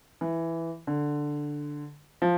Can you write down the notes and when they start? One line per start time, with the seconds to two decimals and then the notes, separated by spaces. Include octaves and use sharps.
0.21 E3
0.87 D3
2.22 F3